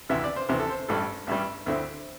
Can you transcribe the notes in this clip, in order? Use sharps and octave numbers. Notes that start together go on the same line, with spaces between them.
D2 C3 E3 E5
D5
C5
D2 C3 E3 C5
A4
C5
A1 G2 G3 A4
A1 G2 G3 E5
D2 D3 C4 E4